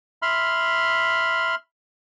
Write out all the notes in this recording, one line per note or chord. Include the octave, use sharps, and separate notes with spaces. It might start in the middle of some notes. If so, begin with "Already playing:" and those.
E5 B5 C6 F6